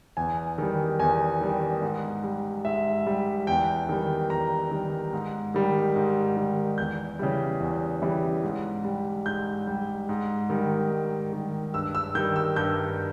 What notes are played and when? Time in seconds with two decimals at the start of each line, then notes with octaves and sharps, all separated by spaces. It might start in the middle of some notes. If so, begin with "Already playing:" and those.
0.17 E2 G#5
0.58 D#3 G3
1.00 E2 G#5
1.41 D#3 G3
1.82 G#2
2.24 G3
2.65 G#2 E5
3.07 G3
3.47 E2 G5
3.89 D#3 G3
4.30 E2 A#5
4.71 D#3 G3
5.13 G#2
5.54 D#3 G3
5.96 G#2
6.37 D#3 G3
6.78 E2 G6
7.19 C#3 E3 G3
7.60 E2
8.02 C#3 E3 G3
8.43 G#2
8.84 G3
9.26 G#2 G6
9.67 G3
10.09 G#2
10.50 D#3 G3
10.91 G#2
11.33 D#3 G3
11.74 G2 E6
11.95 E6
12.15 D#3 G6
12.18 G3
12.36 E6
12.56 G2 G6